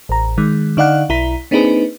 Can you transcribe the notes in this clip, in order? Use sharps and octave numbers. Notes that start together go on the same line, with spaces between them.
A1 A#5
D#3 G#3
D3 D#4 D5 F5 F#5 F#6
B1 E4 A#5 B6
A#3 C4 D4 D#4 G#4 B4